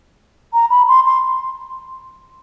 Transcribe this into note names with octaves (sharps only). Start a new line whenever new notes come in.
A#5
B5
C6
C6